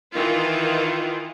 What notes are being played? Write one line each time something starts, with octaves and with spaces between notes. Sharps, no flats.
D#3 E3 F4